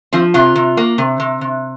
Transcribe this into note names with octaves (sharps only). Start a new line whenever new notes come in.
F3 C4
C3 F4
C3
A#3
C3
C3
C3